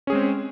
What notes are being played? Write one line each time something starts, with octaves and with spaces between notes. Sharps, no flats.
G#3 C4 C#4 G#4